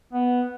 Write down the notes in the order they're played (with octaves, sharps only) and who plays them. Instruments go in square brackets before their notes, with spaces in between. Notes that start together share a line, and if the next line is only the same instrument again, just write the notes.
[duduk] B3